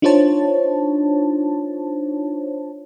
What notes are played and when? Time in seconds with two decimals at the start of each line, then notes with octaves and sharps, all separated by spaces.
0.02 D4 D#4 F4 C5 C#5 A5